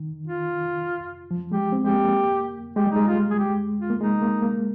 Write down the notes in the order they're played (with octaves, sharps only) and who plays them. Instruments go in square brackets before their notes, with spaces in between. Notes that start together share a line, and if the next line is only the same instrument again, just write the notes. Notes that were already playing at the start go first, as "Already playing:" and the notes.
Already playing: [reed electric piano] D#3
[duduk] F4
[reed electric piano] F3
[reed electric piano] G#3 [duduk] G4
[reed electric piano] C4
[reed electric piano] G#3 [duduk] G4
[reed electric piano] A#3
[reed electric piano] G#3 [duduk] G4
[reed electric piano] G3
[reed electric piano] G#3 [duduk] D#4
[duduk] F4
G#4
G4
F4
[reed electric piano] A#3
[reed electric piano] G#3 [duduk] D#4
[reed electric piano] A#3
A#3